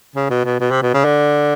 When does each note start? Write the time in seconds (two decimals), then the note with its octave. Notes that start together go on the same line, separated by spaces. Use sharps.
0.15 C#3
0.30 B2
0.45 B2
0.60 B2
0.71 C3
0.82 B2
0.94 C#3
1.04 D3